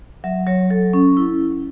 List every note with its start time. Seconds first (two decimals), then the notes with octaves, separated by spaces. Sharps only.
0.24 F#3 E5
0.47 F#3 C#5
0.70 F#3 A4
0.93 C#4
1.17 E4